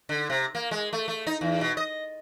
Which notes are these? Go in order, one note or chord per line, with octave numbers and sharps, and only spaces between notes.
D3
C3
A#3
G#3
A3
A3
D#4
E2
B2
D#5